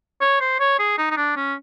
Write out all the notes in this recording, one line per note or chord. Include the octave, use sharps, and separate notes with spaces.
C#5
C5
C#5
G#4
D#4
D#4
D4
C#4